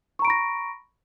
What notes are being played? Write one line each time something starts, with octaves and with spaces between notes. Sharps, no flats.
A#5 B5 C#6 A#6 D7